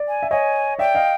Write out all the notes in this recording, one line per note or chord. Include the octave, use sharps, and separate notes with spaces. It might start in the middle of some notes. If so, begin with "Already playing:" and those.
Already playing: D5
G#5
E5
C#5 D#5 G#5
D5 E5 G5
D#5 F5